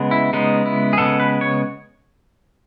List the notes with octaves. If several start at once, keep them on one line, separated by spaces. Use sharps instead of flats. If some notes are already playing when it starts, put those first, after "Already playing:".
Already playing: C#3 G#3 B3
E4
C#3 G#3 B3 D#4
E4
G#4
C#3 G#3 B3 A4
B4
C#5